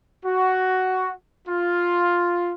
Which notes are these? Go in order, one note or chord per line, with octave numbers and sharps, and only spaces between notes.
F#4
F4